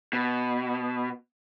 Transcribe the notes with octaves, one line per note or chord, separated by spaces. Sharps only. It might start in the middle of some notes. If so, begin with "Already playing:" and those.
B2